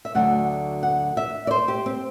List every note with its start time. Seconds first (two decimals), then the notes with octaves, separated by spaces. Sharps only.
0.05 E5
0.15 D2 D3 F#3 F#5
0.83 F#5
1.17 E5
1.47 D5
1.51 C5
1.68 G4
1.86 C4